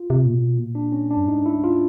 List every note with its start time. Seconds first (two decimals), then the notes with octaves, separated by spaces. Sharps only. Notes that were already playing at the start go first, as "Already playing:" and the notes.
Already playing: F4
0.10 C3
0.26 A#2
0.33 B2
0.57 A#2
0.75 D4
0.92 C#4
1.10 D4
1.17 G2
1.28 G#2 D#4
1.46 E4
1.64 F4